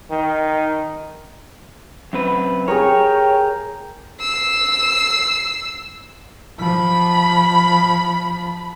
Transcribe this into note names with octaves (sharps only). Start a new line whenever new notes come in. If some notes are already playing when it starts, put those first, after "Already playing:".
D#3
F#2 C4 B4
G#4 A#4 C#5 G5
E6 C7
F3 B5